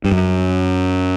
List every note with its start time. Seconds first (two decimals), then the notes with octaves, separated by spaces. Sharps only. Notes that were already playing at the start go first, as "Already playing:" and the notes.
0.04 G2
0.12 F#2